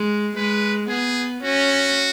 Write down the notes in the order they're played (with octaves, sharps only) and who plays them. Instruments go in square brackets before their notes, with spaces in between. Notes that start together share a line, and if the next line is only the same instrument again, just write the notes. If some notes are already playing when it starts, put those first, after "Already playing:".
Already playing: [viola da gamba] G#3
[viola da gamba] G#3 [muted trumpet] B4
[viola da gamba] B3 [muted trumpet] G#4
[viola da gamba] C#4 [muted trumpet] F#4